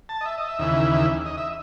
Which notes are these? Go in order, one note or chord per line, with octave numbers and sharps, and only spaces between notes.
A5
D#5
E5
D#5
E5
D#2 C#3 E3
E5
D#5
E5